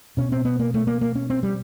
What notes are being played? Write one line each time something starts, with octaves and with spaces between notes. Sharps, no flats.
B2 C#4
C4
B3
A#3
A3
A#3
A#3
C#4
C4
G3